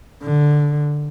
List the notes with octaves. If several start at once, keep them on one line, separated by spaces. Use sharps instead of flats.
D3